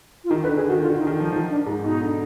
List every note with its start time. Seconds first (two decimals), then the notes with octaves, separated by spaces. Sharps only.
0.24 F4
0.30 D#3 D#4
0.43 D3 B4
0.56 D3 G#4
0.69 D#3 F#4
0.81 D3 F4
0.94 D3
0.99 D#4
1.07 D#3
1.15 D#4
1.20 F3
1.32 F3 D#4
1.50 D4
1.66 G#2 D#4
1.83 B2 D#4
2.00 D3